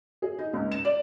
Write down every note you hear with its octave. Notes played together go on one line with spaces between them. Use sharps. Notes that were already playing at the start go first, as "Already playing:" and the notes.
G#4
D#4
C#2
E7
D5